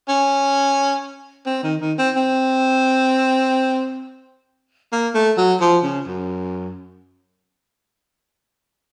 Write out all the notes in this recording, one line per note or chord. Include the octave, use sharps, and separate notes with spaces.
C#4
C4
D#3
D#3
C4
C4
A#3
A3
F#3
F3
C#3
F#2